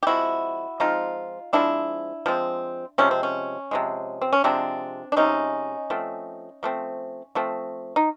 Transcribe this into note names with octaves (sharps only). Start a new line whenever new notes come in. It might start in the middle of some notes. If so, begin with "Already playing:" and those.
G4
F3 G#3 C4 E4 F#4
F3 G#3 C4 D#4 F4
F3 G#3 C4 D4 E4
F3 G#3 C4
C3 F3 G#3 C#4
C4
C#4
C3 F3 G#3
C4
C#4
C3 F3 G#3 C4 D4
D4
C3 F3 G#3 C#4 D#4
F3 A3 C4
F3 A3 C4
F3 A3 C4
D#4